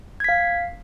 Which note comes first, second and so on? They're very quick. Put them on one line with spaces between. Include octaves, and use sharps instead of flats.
G#6 B6 F5